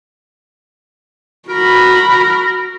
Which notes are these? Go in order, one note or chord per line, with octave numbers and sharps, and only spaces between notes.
F#4 A#4 B5